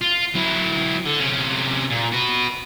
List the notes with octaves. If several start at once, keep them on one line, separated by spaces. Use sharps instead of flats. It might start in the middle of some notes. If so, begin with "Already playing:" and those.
F4
F#3 E4
D3
C3 C#4
A#2
F#4 B4